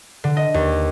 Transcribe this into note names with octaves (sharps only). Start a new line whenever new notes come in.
D3
D#5
D#2